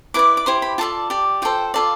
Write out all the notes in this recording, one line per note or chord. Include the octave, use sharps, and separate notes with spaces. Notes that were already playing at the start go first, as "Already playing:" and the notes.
E4 B4 D5 D6
D6
E4 G4 C5 C6
B5
F4 A4 D5 A5
G4 D5
F4 A4 C5 G5
F4 A4 D5 F5